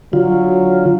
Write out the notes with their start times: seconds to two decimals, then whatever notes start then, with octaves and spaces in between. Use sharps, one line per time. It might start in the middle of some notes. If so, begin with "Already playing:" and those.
0.13 D3 F#3 F4